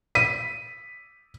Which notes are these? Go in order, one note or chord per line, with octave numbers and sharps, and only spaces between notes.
B6 D#7